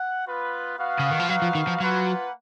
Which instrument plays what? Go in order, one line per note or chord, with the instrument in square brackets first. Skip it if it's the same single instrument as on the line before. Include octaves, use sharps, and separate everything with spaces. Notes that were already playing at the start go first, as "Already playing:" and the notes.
Already playing: [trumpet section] F#5
B3 F4 B4
B3 F#4 B4 F5
[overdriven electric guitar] C#3
D#3
F3
[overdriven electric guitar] F#3 [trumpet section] D#4 F#4 B4 F5
[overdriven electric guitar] F3
D#3
F3
[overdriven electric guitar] F#3 [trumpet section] A#3 F4 B4 F#5